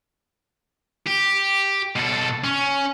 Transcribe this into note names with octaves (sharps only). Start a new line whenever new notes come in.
G4
B2 A4
C#4